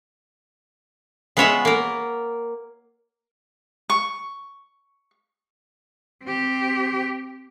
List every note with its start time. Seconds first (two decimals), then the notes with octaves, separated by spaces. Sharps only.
1.37 G#3 B3 F4 C#5 E5 F#5
1.65 A#3 A#4
3.90 C#6
6.23 C4 G4